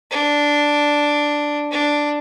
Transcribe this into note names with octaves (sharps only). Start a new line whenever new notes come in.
D4
D4